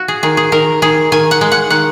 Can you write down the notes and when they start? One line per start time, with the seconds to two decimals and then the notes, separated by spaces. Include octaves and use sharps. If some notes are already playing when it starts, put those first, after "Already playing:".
Already playing: F#4
0.08 G#4
0.23 D#3 G#4
0.37 G#4
0.52 D#3 A#4
0.82 D#3 G#4
1.12 D#3 G#5
1.31 F#5
1.41 G#3
1.52 F#5
1.70 D#3 F#5